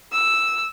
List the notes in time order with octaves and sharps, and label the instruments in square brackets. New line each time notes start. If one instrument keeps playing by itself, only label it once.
[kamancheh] E6